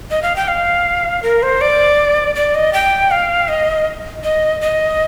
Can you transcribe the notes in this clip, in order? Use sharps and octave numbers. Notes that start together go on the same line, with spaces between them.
D#5
F5
G5
F5
A#4
C5
D5
D5
D#5
G5
F5
D#5
D#5
D#5